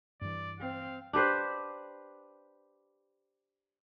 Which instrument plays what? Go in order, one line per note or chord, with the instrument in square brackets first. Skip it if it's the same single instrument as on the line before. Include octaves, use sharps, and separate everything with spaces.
[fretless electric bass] G2 E3 [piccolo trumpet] D5
[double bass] C4 [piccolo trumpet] F5
[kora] D4 G4 B4 C5